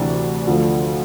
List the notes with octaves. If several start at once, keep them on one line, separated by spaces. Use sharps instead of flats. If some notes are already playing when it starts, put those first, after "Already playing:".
Already playing: D2 C3 E3 D4
D2 D3 F3